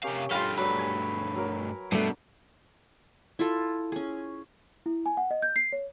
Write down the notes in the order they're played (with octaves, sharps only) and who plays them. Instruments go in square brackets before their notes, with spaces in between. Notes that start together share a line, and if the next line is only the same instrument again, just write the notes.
[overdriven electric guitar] C3 F5 [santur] C#4 G4 A#4
[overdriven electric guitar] G2 A3 [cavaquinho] F4 F#4 F5 [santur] B5
[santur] F#3 G3 [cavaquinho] B4
[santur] G#5
F#3 A#4
[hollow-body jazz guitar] G2 A3 [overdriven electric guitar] B2 [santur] D4
[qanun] E4 F4 A4
C#4 G#4
[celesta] E4
G#5
F#5
D#5
G6
C7
C#5